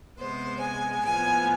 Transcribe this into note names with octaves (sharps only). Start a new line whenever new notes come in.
C3 G#3 B3 C5
G#5
A2 F3 B3 G#5